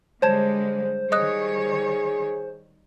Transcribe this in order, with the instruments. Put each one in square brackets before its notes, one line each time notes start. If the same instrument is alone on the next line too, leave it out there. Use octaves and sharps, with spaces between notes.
[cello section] D3 G3 G#3 [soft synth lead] C5 [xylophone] C#5 A5 G#6
[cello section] D#3 G3 C#5 [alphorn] G#4 [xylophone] D#5 D#6 F#6